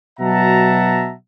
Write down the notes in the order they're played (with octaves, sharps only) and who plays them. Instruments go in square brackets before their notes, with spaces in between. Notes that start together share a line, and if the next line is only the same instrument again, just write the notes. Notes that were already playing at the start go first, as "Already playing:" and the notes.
[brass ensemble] B2 F#3 E5 F#5 A5 A#5